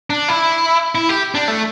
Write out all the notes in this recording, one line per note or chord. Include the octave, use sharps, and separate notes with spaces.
D4
E4
E4
G4
D4
A3